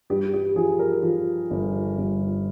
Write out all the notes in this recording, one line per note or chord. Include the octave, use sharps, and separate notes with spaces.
G2 G4
G4
F3 G#4
A#4
F3
G1
G1